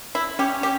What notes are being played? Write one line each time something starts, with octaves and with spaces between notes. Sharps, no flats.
E4
C#4 G4
G4